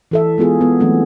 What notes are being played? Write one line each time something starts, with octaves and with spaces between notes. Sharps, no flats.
E3 A4 E5
G#3 B3 F4 G#4
B3
E3 F#3 A3 C4 D4